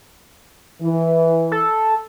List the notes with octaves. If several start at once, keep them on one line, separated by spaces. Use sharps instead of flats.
E3
A4